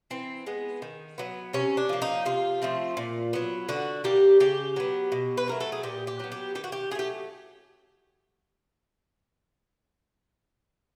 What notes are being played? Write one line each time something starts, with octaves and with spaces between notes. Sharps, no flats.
E3 C4
G#3 B3
D#3
F#3 B3
C3 C#4
D4
F3 A#3
D#4
C3 F4
F3 A3 C4
A#2
F#3 B3
D3 F#4
G3 A#3 G4
C#3 G4
F#3 B3
B2
B4
F#3 A3 A#4
A4
G#4
A#2 G4
G4
F#3 B3
G4
D#3 G4
F#4
G4
F#3 A3 G4 G#4